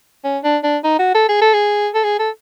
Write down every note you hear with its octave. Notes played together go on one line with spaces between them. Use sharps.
C#4
D4
D4
D#4
F#4
A4
G#4
A4
G#4
A4
G#4
A4